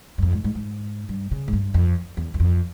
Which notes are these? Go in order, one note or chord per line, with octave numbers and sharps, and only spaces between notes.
G2
F2
G#2
G#2
G#2
G2
C#3
G#2
G2
F2
E2
E2
F2